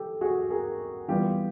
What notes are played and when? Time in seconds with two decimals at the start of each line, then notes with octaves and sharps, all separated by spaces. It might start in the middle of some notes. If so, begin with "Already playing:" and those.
Already playing: G4 A4
0.21 F#4 G#4
0.50 G#4 A#4
1.08 E3 G3 B3 F4 G4